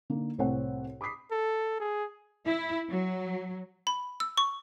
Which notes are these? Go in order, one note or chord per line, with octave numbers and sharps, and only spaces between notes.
D3 A#3 D#4
C2 A2 C4 C#5 F#5
B5 D6 D#6 B6 C7
A4
G#4
E4
F#3
B5
E6
C#6